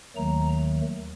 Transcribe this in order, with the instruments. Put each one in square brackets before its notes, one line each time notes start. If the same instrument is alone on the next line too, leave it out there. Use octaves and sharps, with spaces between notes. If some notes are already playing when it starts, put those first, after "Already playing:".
[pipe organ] D#2 D#3 F#3 A3 A#5